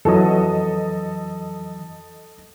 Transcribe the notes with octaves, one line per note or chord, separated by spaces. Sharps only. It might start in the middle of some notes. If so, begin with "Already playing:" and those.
F2 E3 F#3 A4 D#5